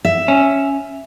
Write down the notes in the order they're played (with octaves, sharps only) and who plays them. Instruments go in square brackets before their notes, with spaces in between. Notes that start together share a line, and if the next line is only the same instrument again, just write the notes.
[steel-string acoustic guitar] E5
[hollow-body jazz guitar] C#4